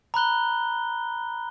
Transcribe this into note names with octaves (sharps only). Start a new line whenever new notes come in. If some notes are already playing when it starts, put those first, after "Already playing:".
A#5 B5 F#6 G7